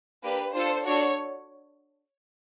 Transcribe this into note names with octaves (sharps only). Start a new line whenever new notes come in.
A#3 D4 G4 B4
D4 F4 A4 C5
D4 F#4 A4 C#5